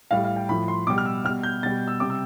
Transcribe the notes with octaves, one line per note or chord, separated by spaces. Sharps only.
A2 G3 F5
F5
G5
A2 F3 B5
C6
B2 G3 D6
F6
E6
B2 G3 F6
G6
B2 G3 A6
E6
C3 G3 D6
E6